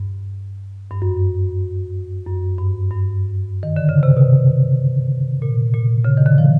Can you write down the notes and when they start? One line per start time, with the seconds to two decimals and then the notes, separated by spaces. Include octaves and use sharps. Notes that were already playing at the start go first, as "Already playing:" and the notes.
Already playing: G2
0.91 G2
1.02 F#2
2.27 F#2
2.58 G2
2.91 G2
3.63 D#3
3.76 D3
3.89 C#3
4.03 C3
4.17 B2
5.42 A#2
5.74 A#2
6.04 C#3
6.18 D#3
6.26 D3
6.38 F3